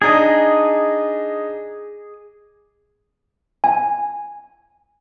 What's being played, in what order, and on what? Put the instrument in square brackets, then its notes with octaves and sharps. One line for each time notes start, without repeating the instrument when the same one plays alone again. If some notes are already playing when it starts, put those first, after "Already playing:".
[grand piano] D4 D#4 [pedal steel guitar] G#4 D#5
[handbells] G#5